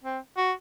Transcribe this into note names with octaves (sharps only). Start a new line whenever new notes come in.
C4
F#4